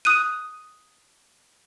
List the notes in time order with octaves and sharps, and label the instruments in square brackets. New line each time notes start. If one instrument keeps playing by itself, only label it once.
[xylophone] D#6 F#6 D#7